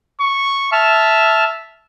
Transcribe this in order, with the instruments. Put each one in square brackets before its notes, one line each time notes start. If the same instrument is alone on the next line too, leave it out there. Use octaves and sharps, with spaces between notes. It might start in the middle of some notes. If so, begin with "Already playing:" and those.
[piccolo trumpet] C#6
[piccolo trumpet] E5 [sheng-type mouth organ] A5 F6